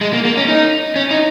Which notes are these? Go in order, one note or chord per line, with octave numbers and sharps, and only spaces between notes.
G#3
A#3
A#3
C#4
D#4
C#4
D#4